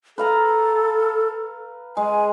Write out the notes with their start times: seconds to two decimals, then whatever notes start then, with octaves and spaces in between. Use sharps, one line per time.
0.18 A4 B4 F5 A#5
1.97 G#3 G#5